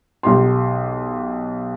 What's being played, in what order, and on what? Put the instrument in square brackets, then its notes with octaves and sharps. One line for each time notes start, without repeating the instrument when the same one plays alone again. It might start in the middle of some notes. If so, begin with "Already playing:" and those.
[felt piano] B1 G4 C6